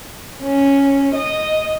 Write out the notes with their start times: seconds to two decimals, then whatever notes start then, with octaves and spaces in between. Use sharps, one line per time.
0.43 C#4
1.15 D#5